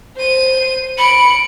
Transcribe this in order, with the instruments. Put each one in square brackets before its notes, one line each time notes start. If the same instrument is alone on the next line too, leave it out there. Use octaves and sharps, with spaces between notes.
[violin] C5 D#7
[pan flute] B5 [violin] C#7 D7